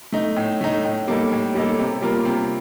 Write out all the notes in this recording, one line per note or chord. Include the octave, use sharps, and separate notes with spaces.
A3 D#4
A2
A3 D#4
A2
G3 A#3 D#4 A4
A2
G3 A#3 D#4 A4
C3
G3 A#3 F4 A#4
C3